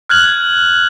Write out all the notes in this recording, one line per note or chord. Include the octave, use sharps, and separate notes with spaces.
F6 F#6 G#6 F#7